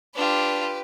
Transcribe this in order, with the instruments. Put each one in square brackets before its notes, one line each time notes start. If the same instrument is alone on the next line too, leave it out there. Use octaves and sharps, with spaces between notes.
[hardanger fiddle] D4 F4 [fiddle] G4 B4